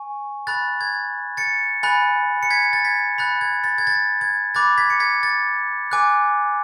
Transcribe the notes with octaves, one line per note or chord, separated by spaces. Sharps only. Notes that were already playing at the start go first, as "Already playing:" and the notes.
Already playing: G#5 C#6
B5 F#6 A6
G#6
A6 C#7
G#5 B5 F#6 A6
C#7
G#6 B6
A6
G#6 B6
B5 F#6 A6
G#6
A6
G#6
A6
G#6
B5 D6 F#6 A6
G#6 B6
C#7
G#6 B6
A6
G#5 D6 F#6